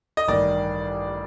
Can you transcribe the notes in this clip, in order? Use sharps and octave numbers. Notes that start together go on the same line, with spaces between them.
D#5
A1 G2 D#3 D5